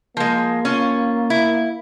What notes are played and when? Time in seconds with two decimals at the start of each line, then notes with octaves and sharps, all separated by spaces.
0.17 F3 G#3 A#3
0.65 C#4 F4
1.30 E4